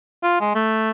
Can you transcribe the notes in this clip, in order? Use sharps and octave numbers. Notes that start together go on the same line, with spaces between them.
F4
G#3
A3